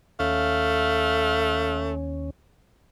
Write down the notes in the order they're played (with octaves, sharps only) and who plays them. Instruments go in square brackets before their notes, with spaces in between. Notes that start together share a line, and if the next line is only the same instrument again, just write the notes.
[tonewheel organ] D#2 C#4 [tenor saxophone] A3 [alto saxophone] F5